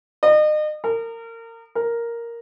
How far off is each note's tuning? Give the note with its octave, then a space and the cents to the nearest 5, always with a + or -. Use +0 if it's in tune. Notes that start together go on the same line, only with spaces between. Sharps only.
D#5 -35
A#4 -30
A#4 +0